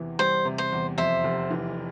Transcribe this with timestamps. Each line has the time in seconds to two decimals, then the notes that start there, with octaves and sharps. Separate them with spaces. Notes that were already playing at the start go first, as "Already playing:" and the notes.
Already playing: E2 C3 E3
0.19 G3 C5
0.45 C3
0.58 C5
0.72 E2
0.98 F2 C5 E5
1.24 F1
1.51 E3